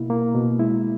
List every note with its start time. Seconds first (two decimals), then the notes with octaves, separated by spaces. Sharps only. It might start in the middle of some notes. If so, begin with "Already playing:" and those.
Already playing: B2 A#3 E4
0.10 A#3
0.35 B2
0.59 G#3 E4